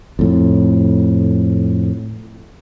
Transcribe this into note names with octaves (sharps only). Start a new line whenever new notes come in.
F2 A2